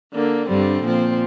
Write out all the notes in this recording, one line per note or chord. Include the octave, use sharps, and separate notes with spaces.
D3 A#3 D4
G2 D3 G3 C4
A#2 F3 C4